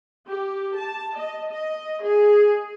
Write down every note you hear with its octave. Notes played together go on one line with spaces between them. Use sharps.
G4
A5
D#5
D#5
G#4